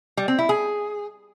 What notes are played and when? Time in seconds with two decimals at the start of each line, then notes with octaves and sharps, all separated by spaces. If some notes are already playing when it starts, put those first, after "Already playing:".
0.17 G3
0.28 C4
0.39 E4
0.49 G#4